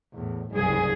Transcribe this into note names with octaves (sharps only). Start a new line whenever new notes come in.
E2 A2
F#1 C2 G2 G#4